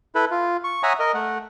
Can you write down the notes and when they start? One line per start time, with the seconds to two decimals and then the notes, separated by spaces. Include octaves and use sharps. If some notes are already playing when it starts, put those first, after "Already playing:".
0.15 E4 A4 B4
0.31 F4
0.64 C#6
0.83 C#5 E5 F#5 G#5 A#5 D#6
0.99 A#4 D#5
1.14 A3 F#5